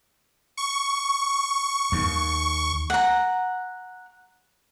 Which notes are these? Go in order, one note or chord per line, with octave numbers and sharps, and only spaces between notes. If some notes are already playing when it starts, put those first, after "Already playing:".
C#6
D#2
F#5 A#5